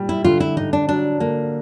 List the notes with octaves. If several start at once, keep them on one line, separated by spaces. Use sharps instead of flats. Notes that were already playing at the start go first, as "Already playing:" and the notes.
Already playing: A#2 G3
E4
D3 F4
E4
D3 D#4
D4
F#3 D4
D3 A#3